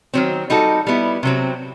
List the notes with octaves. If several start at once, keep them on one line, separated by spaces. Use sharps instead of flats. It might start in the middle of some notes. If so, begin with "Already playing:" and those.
D#3 F#3 C4
G3 D#4 F#4 A4
G3 B3 E4
C3 F#3 C4